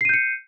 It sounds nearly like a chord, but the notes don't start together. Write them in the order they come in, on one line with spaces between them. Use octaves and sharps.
C7 D#7 G6 C#7